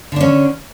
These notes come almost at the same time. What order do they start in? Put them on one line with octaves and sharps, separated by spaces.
D3 D4 C#4